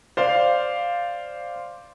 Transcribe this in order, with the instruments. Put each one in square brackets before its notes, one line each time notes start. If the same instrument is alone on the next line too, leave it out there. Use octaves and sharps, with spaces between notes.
[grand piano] C5 D5 F5